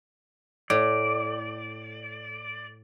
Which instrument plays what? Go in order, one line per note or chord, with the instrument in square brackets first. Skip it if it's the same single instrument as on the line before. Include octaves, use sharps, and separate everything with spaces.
[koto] A2 [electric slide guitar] D5